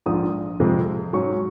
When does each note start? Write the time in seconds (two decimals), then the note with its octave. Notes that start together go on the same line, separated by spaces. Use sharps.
0.06 A#1 G#2 F3 D#6
0.60 F2 C3 F3 G#3 C4
1.13 G#2 F#3 C#4 C#6